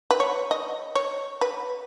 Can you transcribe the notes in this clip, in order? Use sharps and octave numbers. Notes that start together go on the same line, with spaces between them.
B4
C#5
D#5
C#5
B4